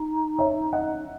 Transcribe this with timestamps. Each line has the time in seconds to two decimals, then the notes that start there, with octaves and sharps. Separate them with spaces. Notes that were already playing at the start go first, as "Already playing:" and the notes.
Already playing: D#4
0.39 C#5 E5
0.73 D#5 F#5